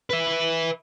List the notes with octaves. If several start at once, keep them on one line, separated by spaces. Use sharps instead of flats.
B4 E5